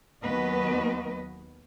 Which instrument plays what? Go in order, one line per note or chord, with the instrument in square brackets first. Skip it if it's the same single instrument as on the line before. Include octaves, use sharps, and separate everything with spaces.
[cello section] D#2 F#3 B3 B4 D#5